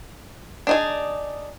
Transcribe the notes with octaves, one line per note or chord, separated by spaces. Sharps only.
D4 D#4 G#4